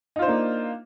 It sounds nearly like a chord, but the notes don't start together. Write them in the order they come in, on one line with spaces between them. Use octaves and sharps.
D#4 F4 C5 D4 A#3